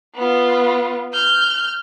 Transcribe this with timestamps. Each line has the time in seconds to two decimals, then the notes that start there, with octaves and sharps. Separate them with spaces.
0.15 B3 F4
1.14 F6 G6